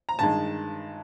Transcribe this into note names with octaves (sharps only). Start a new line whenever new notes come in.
A#5
G2 D#3 G#3 A5